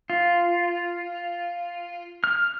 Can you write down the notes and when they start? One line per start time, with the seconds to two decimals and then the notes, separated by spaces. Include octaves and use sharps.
0.10 F4
2.24 F6